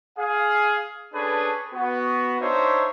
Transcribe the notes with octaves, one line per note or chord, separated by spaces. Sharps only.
G#4 F5
C#4 D4 G#4 A4 B4
B3 F#4
D4 D#4 F4 C5 C#5 E5